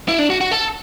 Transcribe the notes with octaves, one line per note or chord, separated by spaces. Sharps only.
E4
D4
F#4
F#4
A4